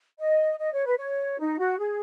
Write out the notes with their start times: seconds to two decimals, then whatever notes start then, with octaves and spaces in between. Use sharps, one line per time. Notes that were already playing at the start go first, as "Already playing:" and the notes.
0.19 D#5
0.60 D#5
0.73 C#5
0.85 B4
0.98 C#5
1.39 D#4
1.59 F#4
1.79 G#4